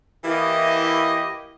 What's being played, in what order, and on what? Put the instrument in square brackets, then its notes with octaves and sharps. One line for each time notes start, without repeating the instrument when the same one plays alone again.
[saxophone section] E3 A#3 E4 [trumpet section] G4 D#5